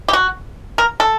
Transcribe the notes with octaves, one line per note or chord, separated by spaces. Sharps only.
G4
F#4
A#4
A4